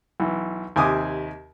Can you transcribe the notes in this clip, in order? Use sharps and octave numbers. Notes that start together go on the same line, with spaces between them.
B1 E3
D#2 C3 G#5 D6 D#6